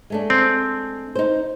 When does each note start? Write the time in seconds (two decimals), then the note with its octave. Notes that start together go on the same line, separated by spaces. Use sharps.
0.10 G#3 A3 D4
0.30 C4
1.15 D#4 C5